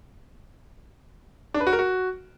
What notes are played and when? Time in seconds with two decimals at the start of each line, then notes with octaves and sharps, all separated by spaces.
1.54 D4
1.61 B4
1.67 F#4
1.73 A#4
1.79 F#4